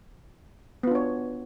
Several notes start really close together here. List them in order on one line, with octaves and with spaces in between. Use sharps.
B3 F4 D4 C#5